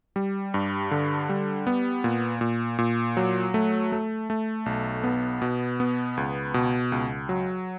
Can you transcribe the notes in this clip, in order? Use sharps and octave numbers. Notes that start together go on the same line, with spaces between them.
G3
G2
D3
G3
B3
A#2
A#2
A#2
F#3
A3
A3
A3
B1
B3
B2
B3
C#2
B2
C#2
F#3